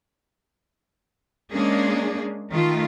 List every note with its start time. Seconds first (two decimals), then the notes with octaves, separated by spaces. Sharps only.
1.53 G#3 A#3 C#4 D4 G#4
2.52 D#3 A3 F4